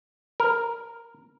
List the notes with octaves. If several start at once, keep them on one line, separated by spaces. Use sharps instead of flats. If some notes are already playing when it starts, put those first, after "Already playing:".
A#4